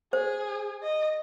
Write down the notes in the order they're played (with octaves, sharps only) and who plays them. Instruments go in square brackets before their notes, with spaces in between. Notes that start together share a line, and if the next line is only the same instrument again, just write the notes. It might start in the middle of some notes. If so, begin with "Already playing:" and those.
[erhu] G#4 [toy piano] C5
[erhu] D#5